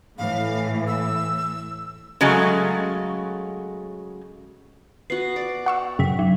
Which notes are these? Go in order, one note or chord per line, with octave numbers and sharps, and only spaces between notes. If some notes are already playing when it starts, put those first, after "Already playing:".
A2 E3 F5
E6
C#3 F#3 G#3 A3
B3 F#4 C7
D5
F#5 C#6 E6
F#2 C#3 G5 B6
F#3